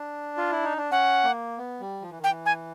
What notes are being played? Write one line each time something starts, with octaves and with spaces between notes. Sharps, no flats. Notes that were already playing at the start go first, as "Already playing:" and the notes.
Already playing: D4
F4
E4
D#4
D4
C#4 F#5
A#3
B3
G3
F3
E3
D#3
G5
E3
G#5